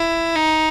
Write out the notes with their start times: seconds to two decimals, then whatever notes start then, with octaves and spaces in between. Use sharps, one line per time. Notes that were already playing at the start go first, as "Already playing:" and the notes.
Already playing: E4
0.35 D#4